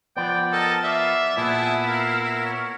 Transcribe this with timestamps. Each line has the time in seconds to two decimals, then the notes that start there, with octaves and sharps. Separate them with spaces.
0.17 F3 B3 D5 G5
0.52 A4 A#4 D#5 A5
0.84 D5 E5 F5
1.37 A#2 B3 E4 G#4 E5 A5
1.87 A#4 F5
2.44 C#5